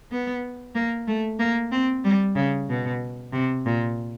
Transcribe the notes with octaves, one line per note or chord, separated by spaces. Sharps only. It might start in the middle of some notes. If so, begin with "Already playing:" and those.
B3
A#3
A3
A#3
C4
G3
C#3
B2
C3
A#2